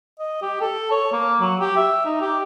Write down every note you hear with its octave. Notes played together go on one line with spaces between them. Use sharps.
D#5
G4
A4
C#5
A#3
F#3
G4
E5
D#4
G4